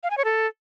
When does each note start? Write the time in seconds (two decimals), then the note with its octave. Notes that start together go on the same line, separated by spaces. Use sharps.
0.03 F5
0.10 G#5
0.18 C#5
0.25 A4